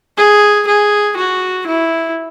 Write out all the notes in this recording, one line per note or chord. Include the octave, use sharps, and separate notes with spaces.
G#4
G#4
F#4
E4